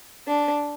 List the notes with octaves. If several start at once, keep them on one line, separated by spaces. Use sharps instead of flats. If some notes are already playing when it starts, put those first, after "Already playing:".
D4